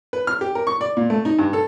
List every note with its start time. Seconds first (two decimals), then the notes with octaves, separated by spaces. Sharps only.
0.13 B4
0.27 F6
0.41 G4
0.55 A#4
0.67 C#6
0.81 D5
0.97 A#2
1.10 A3
1.25 D#4
1.39 G2
1.53 A4